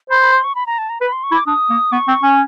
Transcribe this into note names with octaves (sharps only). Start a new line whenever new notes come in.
C5 B5
B5
C6
C#6
B5
A#5
A5
A#5
B4 B5
C6
C#6
E4
D6
D4 D#6
A#3
B3 C#6
C4
C#4